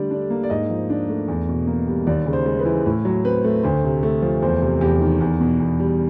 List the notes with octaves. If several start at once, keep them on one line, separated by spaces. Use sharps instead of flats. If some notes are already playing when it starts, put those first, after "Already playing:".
Already playing: D3 G3 A3 D5
D4
A#3
D5
G#2 D#5
F3
D4
A3
E2
B2
A#3
G3
D#2 D5
C#3
C5
G#3
B4
E3
A2
F#3
C4 B4
A3
D2 C5
C3
A3
F3
E2 C5
C3
E2 G4
D#3
E2
B2
E2
G3